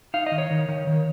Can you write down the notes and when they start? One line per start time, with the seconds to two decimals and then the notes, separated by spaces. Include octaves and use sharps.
0.14 D#4 F5
0.26 D#5
0.32 D#3
0.38 C#5
0.50 D#3
0.68 D#3
0.87 D#3